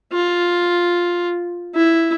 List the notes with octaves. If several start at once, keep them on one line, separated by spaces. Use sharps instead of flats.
F4
E4